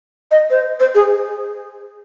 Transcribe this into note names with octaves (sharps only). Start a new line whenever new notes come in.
D#5
C5
C5
G#4